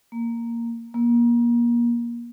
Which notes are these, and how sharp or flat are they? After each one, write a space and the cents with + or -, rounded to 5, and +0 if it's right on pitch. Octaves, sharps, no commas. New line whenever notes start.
A#3 -5
A#3 +30